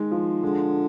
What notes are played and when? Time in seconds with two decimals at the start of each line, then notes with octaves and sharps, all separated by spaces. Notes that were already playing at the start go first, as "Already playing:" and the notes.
Already playing: D#3 G#3
0.11 F3
0.43 D3 G#3